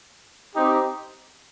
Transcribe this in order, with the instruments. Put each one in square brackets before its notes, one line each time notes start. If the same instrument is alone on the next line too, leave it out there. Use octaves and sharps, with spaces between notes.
[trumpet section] C4 D#4 G4